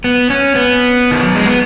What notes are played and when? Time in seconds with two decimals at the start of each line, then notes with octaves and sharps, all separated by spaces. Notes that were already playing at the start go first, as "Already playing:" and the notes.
0.04 B3
0.30 C#4
0.55 B3
1.11 D#3
1.23 F#3
1.35 G#3
1.46 B3